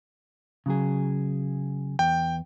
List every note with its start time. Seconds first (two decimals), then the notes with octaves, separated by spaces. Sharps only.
0.66 C#3 F#3 G#4
1.99 E2 G5